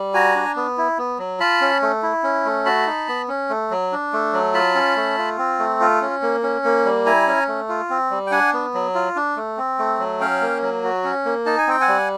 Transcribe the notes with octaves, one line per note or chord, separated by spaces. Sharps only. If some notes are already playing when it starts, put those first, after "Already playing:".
Already playing: G3
F#4 G#5 A#5
D4
B3
E4
B3
F#3
F4 A5 B5
C#4
A3
E4
C#4
A3
F#4 A5 B5
D#4
B3
C#4
A3
F#3
D4
A3
F#3
F4 A5 B5
C#4
A3
F4
C4
A3
F4
C#4
A#3
C#4
A#3
G3
E4 G#5 A#5
C#4
A3
F4
C4
G3
G5
D4 F#5 G#5
B3
F#3
F4
D4
A3
C4
A3
F#3
C#4 F5 G5
A#3
F#3
F#4
C#4
A#3
D#4 A5
G#5
C4 G5
F#5 G#5
G3